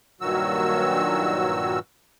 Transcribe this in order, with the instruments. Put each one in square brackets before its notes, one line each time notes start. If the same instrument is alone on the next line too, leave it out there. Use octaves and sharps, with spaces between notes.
[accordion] G2 A#2 D#3 F#3 F#4 E6